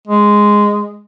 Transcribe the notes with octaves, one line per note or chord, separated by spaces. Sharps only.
G#3